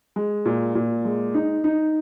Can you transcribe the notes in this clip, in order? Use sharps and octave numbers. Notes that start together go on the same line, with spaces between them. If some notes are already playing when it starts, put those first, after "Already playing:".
G#3
A#2
A#2
G#3
D#4
D#4